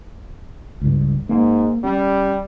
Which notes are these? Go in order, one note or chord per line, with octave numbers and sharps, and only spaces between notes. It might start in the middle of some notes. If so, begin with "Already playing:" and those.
C#2 G2
G#2 A#3
G3 C#4